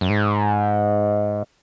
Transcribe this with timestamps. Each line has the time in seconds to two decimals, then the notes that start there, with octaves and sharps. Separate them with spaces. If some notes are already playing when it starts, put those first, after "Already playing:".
0.01 F#2
0.10 G#2